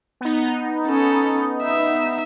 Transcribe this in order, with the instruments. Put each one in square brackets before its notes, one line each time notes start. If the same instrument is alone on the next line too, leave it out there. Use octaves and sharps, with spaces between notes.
[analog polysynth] B3 D#4
[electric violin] C#4 A4
E5